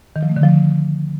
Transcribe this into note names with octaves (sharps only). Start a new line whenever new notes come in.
D#3
F3
A3
D3
F3